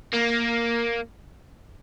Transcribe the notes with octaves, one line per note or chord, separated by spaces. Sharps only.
A#3